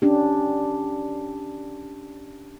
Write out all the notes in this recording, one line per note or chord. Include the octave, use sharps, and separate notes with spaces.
C#4 D4 G4